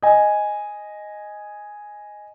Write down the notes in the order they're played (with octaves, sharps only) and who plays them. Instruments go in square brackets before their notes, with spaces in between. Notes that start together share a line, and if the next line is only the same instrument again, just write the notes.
[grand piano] D#5 G#5